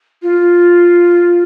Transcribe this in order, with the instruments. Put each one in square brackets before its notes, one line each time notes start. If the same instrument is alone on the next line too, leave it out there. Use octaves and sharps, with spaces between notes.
[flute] F4